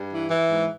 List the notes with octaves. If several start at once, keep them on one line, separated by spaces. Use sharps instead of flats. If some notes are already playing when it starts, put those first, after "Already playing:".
Already playing: G2
E3
E3
G#2